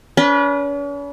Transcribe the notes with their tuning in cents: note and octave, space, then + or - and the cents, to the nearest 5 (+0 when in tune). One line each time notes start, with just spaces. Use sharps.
C#4 +45 B4 -25